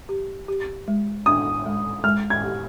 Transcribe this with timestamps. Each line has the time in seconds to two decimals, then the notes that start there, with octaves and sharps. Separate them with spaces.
0.09 G4
0.48 G4
0.88 G#3
1.26 D4 D#6
1.66 G#3
2.04 G#3 F6
2.30 G#6
2.44 G4